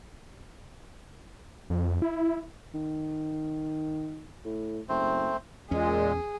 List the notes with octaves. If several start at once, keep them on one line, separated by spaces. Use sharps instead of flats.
F2
E4
D#3
A2
F#1 A3 C4 C5
E2 A#2 G#3 C#4 G#4